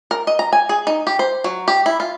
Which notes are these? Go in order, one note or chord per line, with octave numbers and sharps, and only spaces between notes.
A#4
D#5
A#5
G#5
G#4
D#4
G4
C5
F#3
G4
E4
F4